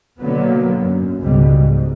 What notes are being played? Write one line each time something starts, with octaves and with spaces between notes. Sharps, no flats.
B2 D3 F#3 A#3 B3
F#2
C#2 G#2 B2 G3
G#2